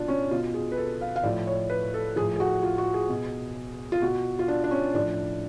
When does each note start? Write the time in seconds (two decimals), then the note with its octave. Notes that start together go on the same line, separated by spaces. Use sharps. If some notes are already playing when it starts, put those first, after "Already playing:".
Already playing: B2 D4 F4
0.08 C#4
0.31 B2 F4
0.54 G#4
0.72 B4
0.77 A4
1.01 F5
1.16 F5
1.23 A2 F3 D5
1.47 C#5
1.70 B4
1.94 A4
2.16 F3 G#4
2.21 A2
2.36 G#4
2.40 F#4
2.63 F4
2.78 F#4
2.94 G#4
3.09 B2
3.92 F4
4.02 B2 F#4
4.39 F4
4.48 D4
4.64 D4
4.71 C#4
4.94 A2 F3 D4